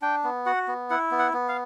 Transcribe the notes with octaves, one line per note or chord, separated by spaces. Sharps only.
D4 G5
B3
F#4 F#5
B3
E4 F#5
B3
F#5
B3
F5